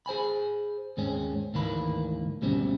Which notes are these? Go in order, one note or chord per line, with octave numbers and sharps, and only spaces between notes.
G#4 C5 G#5 B5
D#2 G#2 G#3 C4 C#4
D2 G#2 D#3 E3 A#3 B5
D2 G#2 B2 G3 C4 C#4